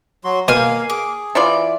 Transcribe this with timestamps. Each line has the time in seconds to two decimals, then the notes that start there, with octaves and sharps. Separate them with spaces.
0.24 F#3 F#4 C6
0.48 B2 A#3 F5 G#5 F6
0.90 G#4 D6
1.35 E3 F4 D5